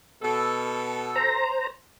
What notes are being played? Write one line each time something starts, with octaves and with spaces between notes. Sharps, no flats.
B2 A4
C5 A#5